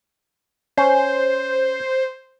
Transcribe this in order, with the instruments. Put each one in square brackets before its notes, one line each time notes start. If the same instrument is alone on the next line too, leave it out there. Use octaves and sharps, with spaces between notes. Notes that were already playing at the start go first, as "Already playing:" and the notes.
[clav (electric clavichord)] C#4 [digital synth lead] C5